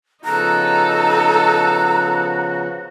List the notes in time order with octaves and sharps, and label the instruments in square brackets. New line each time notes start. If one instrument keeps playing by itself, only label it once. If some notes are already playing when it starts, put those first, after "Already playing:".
[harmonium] C#3 F3 B3 [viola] D#4 A4 [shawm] F#4 [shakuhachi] A#5